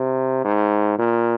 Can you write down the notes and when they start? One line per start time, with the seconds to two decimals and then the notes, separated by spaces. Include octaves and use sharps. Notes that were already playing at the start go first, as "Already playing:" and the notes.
Already playing: C3
0.45 G#2
0.98 A#2